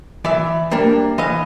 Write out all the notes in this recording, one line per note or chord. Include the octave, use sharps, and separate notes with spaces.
E3 D5 E5
G3 A#3 D4
E3 D#5 F5